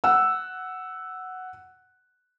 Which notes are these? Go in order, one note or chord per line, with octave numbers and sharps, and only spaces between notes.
F#5 E6